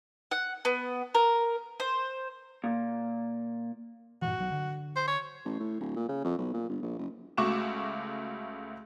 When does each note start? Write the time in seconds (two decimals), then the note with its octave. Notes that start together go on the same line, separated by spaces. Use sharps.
0.31 F#5
0.65 B3
1.15 A#4
1.80 C5
2.64 A#2
4.22 G2 A#2 E3 F#4
4.38 B1 F#3
4.52 D3
4.96 C5
5.07 C#5
5.45 A1
5.59 A2
5.80 D1
5.96 A#2
6.09 C#3
6.24 F2
6.38 B1
6.54 A#2
6.69 G1
6.82 A#1
6.99 F#1
7.37 C#2 A3 F#4 C#6 D6 E7